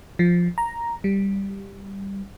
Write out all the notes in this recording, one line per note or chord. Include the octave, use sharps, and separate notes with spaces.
F3
A#5
G3